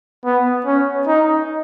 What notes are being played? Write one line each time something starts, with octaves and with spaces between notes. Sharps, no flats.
B3
C#4
D#4